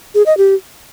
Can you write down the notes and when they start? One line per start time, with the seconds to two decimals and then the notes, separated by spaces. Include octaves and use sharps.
0.15 G#4
0.26 D#5
0.38 G4